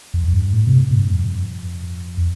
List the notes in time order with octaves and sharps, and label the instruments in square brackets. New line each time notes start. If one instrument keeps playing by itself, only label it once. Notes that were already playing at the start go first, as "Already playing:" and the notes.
[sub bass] F2
F2
G2
A2
C3
A2
G2
F2